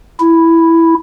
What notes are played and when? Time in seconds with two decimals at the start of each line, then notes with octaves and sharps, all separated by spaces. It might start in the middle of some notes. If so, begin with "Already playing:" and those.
0.20 E4